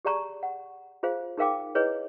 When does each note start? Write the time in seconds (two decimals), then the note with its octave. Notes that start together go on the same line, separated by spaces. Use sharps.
0.05 G4 G#4 D5 A5 A#5 C#6
0.43 F#5
1.03 F4 G#4 C5 F5
1.38 D#4 G#4 A#4 F5 G5 D6
1.75 E4 G#4 B4 C#5 D#5